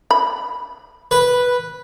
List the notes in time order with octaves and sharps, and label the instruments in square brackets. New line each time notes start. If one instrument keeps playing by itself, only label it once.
[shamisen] B5
[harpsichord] B4